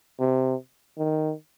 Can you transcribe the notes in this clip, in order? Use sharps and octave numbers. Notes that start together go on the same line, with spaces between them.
C3
D#3